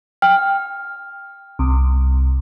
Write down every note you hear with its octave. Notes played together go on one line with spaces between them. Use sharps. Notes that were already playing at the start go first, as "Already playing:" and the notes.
G5 F6
C2